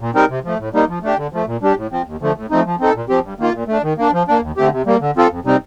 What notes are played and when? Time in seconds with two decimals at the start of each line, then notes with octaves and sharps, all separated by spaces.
0.01 A#2
0.15 G3 C4 D#4 A#4
0.30 C3
0.44 F3 A3
0.59 A2
0.73 G3 A#3 D#4
0.89 F3
1.03 A3 D4 G4
1.17 D3
1.33 F3 A3
1.47 A#2
1.62 G3 D4 G4
1.77 A2
1.92 F3 C4
2.06 D#2
2.21 D3 F3 A3
2.36 A2
2.50 F3 A3 C4 D#4
2.66 F3
2.80 C4 D#4 A4
2.95 A#2
3.09 F3 C4 G4
3.24 G2
3.39 D#3 A#3 F4
3.54 A#2
3.68 A3 D4
3.83 D#3
3.98 A#3 D4
4.13 F3
4.28 A#3 D4
4.42 D#2
4.57 D3 A3 C4 G4
4.72 C3
4.86 G3 A#3
5.01 D3
5.16 F3 C4 F4 A4
5.30 F2
5.45 C3 G3 C4 D#4